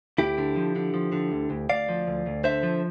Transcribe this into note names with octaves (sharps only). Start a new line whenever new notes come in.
D2 E4 G4
D3
F3
D3
F3
D3
D2
D2
D2 D5 F5
F3
D2
D2
D3 C5 E5
F3